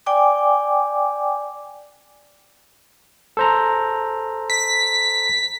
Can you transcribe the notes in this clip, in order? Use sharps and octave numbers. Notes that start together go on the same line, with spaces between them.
D5 G5 G#5 D6
A4 C5 A#5
B6